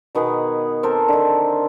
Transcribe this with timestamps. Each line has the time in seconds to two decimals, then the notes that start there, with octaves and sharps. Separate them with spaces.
0.15 B2 D#3 B3 G#4
0.83 C4 A4 A#4 C5
1.08 D3 D#3